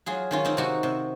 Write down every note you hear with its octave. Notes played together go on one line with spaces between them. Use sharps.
F#3 F4 G#4
D#3 C#4 F4
C4 D#4
C3 D#4 F#4
C3